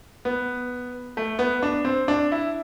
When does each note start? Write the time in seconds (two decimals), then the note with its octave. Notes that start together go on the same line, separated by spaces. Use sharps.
0.25 B3
1.17 A3
1.39 B3
1.62 D4
1.85 C4
2.08 D4
2.32 E4